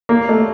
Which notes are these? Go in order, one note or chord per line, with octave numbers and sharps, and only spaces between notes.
A#3
A3